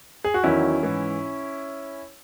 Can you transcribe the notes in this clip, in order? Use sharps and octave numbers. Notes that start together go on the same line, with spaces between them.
G#4
F#4
E2 D#3 F#3 C#4 E4
G#2 E3